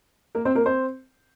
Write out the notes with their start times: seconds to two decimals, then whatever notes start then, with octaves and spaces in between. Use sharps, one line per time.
0.35 A#3 A#4
0.45 C4 C5
0.55 A#3 A#4
0.66 C4 C5